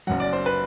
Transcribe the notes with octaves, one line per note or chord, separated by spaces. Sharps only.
F#1 F#2 F#3 F#5
D5
C5
B4